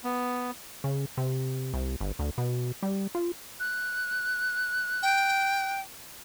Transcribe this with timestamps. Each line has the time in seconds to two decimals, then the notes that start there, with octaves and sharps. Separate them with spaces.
0.04 B3
0.84 C#3
1.17 C3
1.73 C2
2.01 G1
2.19 D2
2.38 B2
2.83 G3
3.15 F4
3.60 F#6
5.02 G5